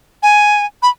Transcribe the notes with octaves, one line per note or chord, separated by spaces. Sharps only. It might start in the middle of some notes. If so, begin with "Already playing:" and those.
G#5
B5